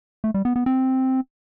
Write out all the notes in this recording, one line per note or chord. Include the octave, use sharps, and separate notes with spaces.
A3
G3
B3
B3
C4